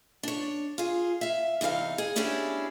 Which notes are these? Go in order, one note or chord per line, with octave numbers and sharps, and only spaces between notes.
D4 C#5
F4 G#4
E5 F5
E2 C3 D#4 G4 F5
G#4
B3 C#4 D4 E4 G4 G#4